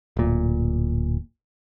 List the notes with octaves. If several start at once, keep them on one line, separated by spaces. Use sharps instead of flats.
D1 A#2